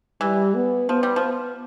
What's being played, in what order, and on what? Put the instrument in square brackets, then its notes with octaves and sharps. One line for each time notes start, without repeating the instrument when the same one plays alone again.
[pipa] E3 [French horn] G3
[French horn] B3
[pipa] F3 [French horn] B3
[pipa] G3
F3
[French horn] B3